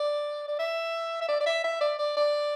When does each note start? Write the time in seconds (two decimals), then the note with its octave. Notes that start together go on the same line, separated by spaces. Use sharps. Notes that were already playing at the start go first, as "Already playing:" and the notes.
Already playing: D5
0.48 D5
0.59 E5
1.21 E5
1.28 D5
1.41 D5
1.46 E5
1.64 E5
1.81 D5
1.99 D5
2.17 D5